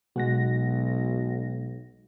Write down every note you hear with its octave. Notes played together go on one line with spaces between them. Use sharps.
B1 B2 G#3 F#4 F#5 A#6